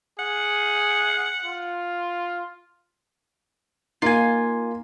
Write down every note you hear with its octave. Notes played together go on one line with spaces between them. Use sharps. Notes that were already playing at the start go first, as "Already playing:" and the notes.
G#4 F#5
F4
A#3 D#4 F4 G#5